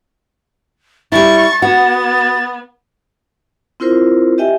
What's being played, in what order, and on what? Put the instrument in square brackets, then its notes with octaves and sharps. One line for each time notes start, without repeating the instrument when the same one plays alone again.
[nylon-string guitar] G3 E4 [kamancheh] C#6 [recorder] A6
[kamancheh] B3 [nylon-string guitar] F#4
[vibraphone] C4 E4 F4 A#4 C5
G4 D#5 E5 G5 G#5